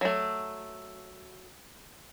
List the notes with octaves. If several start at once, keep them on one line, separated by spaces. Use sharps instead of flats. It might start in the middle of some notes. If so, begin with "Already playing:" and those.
F#3 A3